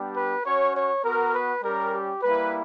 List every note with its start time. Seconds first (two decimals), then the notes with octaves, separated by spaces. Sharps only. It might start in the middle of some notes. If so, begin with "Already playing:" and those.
Already playing: G3 B3 D4 G4
0.17 B4
0.46 C#4 F#4 C#5
0.75 C#5
1.05 B3 F#4 A#4
1.34 B4
1.63 G3 C#4 G4 A#4
1.94 G4
2.23 G3 A#3 E4 B4